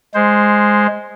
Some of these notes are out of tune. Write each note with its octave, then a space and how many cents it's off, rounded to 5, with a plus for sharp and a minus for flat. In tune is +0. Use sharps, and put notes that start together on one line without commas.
G#3 +0 C5 +0